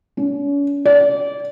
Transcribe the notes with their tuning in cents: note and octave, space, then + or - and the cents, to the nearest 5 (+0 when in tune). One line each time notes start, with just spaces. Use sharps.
C#4 +40
D5 -25